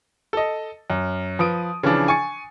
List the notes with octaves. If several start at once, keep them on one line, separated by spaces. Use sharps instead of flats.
A4 D#5
F#2
F3 B4 D#6 D7
C#3 E3 F3 D4
G#5 C#6 A6 C#7